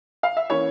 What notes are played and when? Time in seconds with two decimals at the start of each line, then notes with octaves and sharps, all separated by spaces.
0.23 F5
0.37 E5
0.50 E3 A#3 C#4 C#5